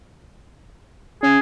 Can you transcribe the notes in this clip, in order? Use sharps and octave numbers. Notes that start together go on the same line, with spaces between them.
C#4 G#4